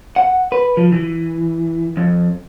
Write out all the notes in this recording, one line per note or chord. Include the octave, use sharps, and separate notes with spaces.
F#5
B4
F3
E3
F2